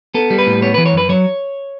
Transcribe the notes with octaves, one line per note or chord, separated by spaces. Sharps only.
B3 A4
G3
B4
A2
B3 C#5
E3 B4
C#5
F#2 B4
F#3 C#5